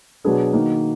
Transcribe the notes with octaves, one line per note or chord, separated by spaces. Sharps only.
B2 F#3 D4 G#4 B4
D#3 A#3 D#4 F#4